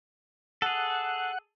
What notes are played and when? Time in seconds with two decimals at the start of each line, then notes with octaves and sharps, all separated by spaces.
0.62 G#4 A4 F#5